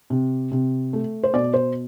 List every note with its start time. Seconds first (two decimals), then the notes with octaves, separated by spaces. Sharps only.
0.10 C3
0.52 C3
0.93 A3
1.23 C5
1.33 B2 D5
1.54 C5